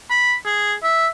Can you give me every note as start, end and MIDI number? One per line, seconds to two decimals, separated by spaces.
0.10 0.34 83
0.45 0.74 68
0.83 1.07 76